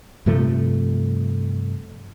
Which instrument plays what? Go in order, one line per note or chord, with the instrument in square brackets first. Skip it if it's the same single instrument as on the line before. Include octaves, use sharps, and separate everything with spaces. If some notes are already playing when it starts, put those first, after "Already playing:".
[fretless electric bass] G2 C3 F3 A3